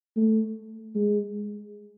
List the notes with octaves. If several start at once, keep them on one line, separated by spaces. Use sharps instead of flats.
A3
G#3